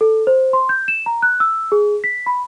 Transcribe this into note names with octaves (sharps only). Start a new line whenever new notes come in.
A4
C5
C6
G6
E7
A#5
F#6
E6
G#4
B6
B5